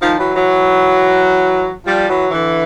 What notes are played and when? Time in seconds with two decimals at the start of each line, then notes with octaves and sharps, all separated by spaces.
0.01 D#3 F3
0.18 E3 F#3
0.34 E3 F#3
1.87 F3 G3
2.09 E3 F#3
2.31 D3 E3